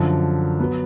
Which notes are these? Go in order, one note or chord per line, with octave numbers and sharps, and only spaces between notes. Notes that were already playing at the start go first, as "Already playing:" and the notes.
Already playing: F#2 D3 F3
F#3 B3